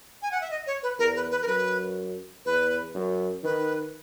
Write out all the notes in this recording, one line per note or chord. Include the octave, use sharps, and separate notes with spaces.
G#5
F#5
E5
D#5
C#5
B4
E2 A#4
B4
B4
A#4
F#2 B4
E2 B4
F#2
D#3 B4